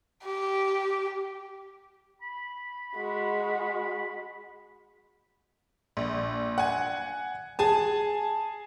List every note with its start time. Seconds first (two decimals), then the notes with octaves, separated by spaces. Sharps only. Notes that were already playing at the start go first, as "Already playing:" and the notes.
0.25 G4
2.21 B5
2.96 G#3 F#4
5.97 A#1
6.58 F#5 G#5
7.59 G#4 G#5 A5